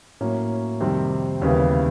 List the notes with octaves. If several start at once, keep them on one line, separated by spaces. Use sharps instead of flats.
A2 F#3 A#3 C#4
F2 C3 D#3 G3 C4
D#2 C#3 E3 G3 B3